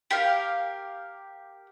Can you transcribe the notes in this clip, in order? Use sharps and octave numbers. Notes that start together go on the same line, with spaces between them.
G4 A#4 F5